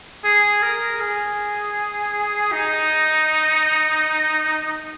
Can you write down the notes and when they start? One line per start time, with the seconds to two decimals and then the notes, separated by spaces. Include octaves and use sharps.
0.24 G#4
0.62 A#4
1.00 G#4
2.52 D#4